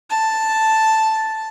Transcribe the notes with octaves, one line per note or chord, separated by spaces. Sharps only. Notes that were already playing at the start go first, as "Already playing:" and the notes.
A5